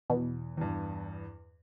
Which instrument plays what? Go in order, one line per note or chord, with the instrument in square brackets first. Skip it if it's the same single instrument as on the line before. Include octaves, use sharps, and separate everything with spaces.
[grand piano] E2 [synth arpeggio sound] B2
[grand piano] E2 G2